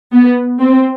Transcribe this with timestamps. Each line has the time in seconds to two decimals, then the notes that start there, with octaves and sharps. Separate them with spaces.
0.13 B3
0.60 C4